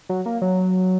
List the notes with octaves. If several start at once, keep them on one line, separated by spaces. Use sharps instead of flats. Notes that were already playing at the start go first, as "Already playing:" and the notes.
F#3
A#3
F#3